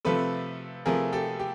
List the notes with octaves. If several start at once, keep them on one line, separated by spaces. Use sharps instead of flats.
C3 F3 A3 A4 B4
C3 F3 A3 G#4 A#4
G4 A4
G4